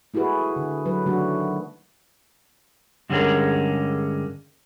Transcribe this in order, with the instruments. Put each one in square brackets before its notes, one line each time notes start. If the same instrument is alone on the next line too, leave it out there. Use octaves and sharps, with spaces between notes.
[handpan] A3 E4 F#4 G#4 B4
D3
F#3 B4
D3 D#3 F#3 A3 D4 F#4
[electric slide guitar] G2 D3 G#3 C#4 G#4 A#4